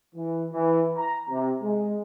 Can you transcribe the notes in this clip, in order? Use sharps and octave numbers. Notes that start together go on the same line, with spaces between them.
E3
E3
A#5
C3
G#3